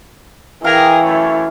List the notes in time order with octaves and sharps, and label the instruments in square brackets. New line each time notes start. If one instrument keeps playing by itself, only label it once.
[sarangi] E3 [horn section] G#4 A#4 [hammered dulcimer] F5 G5 A#5
[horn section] F#2 A3 C#5